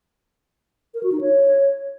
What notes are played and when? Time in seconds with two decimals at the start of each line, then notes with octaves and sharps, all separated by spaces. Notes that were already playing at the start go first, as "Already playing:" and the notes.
0.94 A#4
1.03 F#4
1.12 D#4
1.21 C#5